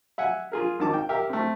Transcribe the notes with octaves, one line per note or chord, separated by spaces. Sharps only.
E5 F#5 G#5
F4 G#4 A#4
G#1 D#3 A5 D6
G5
G4 A#4 E5
A3 C4